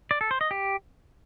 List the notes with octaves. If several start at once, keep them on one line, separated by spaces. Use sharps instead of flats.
D5
A4
C5
D#5
G4